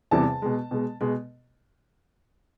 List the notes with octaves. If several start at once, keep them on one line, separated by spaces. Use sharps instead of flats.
E2 C3 E3 G3 A5
B2 G#3
B2 G#3
B2 G#3